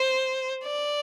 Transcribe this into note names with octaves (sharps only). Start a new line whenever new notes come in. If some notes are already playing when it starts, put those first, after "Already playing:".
Already playing: C5
D5